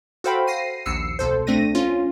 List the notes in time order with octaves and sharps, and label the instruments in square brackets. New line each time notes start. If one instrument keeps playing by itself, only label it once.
[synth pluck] F#4 A4 C5 F5 G5 B5
A#6 C7 D#7
A#1 D#2 E6 C7 C#7
C2 B2 A4 C5
A3 C4 D4 A#6 D#7
C#4 F4